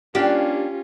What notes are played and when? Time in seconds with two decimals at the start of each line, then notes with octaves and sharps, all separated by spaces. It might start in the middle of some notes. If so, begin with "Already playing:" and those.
0.15 A#3 C#4 D4 F4 G4